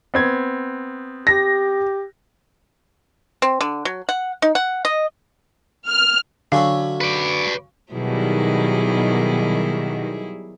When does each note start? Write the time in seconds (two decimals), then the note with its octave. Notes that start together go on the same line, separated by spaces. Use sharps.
0.14 B3 C4 G#6
1.27 G4 A#6
3.42 C4
3.61 D3
3.85 F#3
4.09 F#5
4.42 D#4
4.55 F#5
4.85 D#5
5.88 F6
6.52 D3 F#3 C#4 E5 F5
7.01 B4 D5
7.93 B2 D#3 F#3 G3 E4 G#4